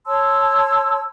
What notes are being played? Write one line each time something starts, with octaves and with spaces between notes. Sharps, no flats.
C#5 A5 C6 E6